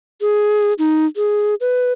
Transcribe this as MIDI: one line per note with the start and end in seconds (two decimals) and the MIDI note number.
0.21 0.73 68
0.79 1.05 63
1.17 1.55 68
1.61 1.92 71